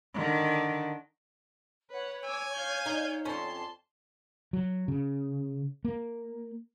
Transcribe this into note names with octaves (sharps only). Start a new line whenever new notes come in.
D3 D#3
B4 C#5 F#5
G#5 D6 E6
F5 G6
D#4
F2 C#4 A5 C6
F#3
C#3
A#3